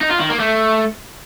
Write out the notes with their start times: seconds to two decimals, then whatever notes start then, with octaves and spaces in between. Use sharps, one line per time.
0.01 D#4
0.11 F4
0.21 D#3
0.30 A#3
0.40 A3